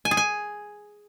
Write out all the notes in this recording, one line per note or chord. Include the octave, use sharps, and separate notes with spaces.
G#5
G#4
G#5